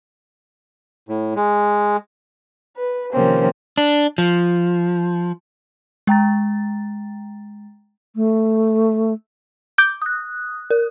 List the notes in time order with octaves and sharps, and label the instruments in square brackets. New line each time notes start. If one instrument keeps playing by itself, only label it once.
[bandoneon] A2
G#3
[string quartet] B4
C3 D#3 F3 A#3 C4 C#4
[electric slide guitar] D4
F3
[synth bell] G#3 G5 A#5 A6
[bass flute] A3
[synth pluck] D6 G6
[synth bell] D#6 F#6
A#4